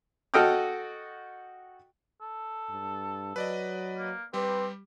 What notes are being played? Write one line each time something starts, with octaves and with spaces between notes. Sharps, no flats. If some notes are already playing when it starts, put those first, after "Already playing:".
F#4 A4 D#5 G5 D#6 F6
A4
G2
F#3 B4 D5 D#5
A#3
G3 C4 G4 B4